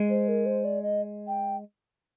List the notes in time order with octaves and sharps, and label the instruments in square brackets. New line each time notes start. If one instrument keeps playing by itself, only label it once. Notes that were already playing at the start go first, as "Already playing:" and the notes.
Already playing: [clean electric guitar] G#3
[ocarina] C5
A#4
C5
D5
D#5
G5